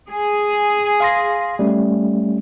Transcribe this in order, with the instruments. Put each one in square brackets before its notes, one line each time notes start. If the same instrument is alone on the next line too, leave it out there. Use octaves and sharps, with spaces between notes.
[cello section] G#4
[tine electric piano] F5 C6 A#6
G3 A3 C#4